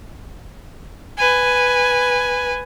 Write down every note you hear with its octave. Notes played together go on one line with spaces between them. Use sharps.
B4 G#5